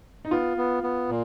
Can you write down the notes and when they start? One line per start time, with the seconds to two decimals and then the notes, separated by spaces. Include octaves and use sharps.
0.25 D#4
0.31 B3 F4
0.57 B3
0.83 B3
1.09 A#2